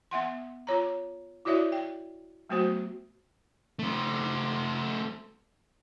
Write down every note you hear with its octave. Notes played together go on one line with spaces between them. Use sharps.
B3 E5 F#5 C6
F4 C#5 A#5
E4 F#4 C#5 D5 E5
G5
F#3 A3 B3 F#4 C5
A3 C4